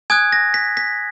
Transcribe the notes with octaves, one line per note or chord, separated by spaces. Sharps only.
G#5 D#6 F#6 G#6
A#6
B6
B6